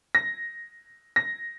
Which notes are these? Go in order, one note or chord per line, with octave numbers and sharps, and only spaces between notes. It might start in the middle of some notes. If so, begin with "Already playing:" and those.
A#6
A#6